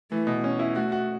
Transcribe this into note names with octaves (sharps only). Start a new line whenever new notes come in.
E3 A3
B2
C#4
E4
A3 F#4
F#4